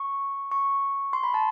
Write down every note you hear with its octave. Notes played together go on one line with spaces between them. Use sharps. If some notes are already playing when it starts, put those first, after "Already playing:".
Already playing: C#6
C#6
C6
B5
A5